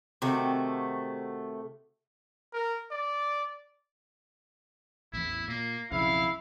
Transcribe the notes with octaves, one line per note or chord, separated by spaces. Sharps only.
C3 D#3 A3 F#4
A#4
D5
A1 E2 E4
A#2 A#3
B1 F2 C#3 E4 F5